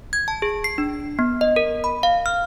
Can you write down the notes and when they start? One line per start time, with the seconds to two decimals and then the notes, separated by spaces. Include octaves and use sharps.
0.13 G#6
0.28 A5
0.42 G#4
0.64 C7
0.78 D4
1.19 B3
1.41 D#5
1.56 A#4
1.84 B5
2.03 F5
2.26 F6